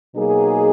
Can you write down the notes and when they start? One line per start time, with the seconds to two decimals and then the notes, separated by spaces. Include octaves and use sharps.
0.16 B2 F#3 A#3 D#4 G#4